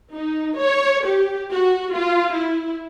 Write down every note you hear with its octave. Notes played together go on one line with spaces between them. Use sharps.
D#4
C#5
G4
F#4
F4
E4